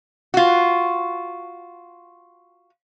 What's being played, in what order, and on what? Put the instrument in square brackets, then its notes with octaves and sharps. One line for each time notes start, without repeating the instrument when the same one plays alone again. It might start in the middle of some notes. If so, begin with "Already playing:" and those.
[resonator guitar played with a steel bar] F4 F#4